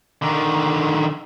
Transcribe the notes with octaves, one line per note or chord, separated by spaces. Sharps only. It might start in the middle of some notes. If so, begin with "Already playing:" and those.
D3 D#3